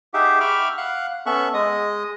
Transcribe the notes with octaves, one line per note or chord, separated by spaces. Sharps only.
D#4 G4 G#4 E5 F#5 D6
E5 G5 B5 C#6 D6 F6
F5 F#5 F#6
B3 C#4 A4 E5 C#6 F#6
G#3 D#5 D#6